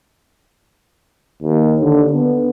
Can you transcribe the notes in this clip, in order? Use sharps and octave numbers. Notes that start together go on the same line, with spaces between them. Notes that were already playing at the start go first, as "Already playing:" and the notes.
D#2
D3
B3